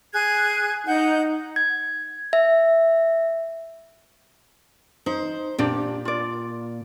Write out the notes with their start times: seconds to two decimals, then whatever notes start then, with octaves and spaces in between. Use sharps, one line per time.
0.13 G#4 F#6 G#6
0.87 D#4 F#5 G6
1.56 G#6
2.33 E5
5.06 D#4 C5
5.59 A#2 D4 G4 D5
6.05 F4 D5